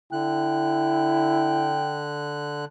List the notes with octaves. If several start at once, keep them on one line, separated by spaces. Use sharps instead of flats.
D3 E4 G5 F#6